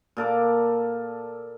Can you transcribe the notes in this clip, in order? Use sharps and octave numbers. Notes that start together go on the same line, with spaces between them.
A#2 A4 A#4 D6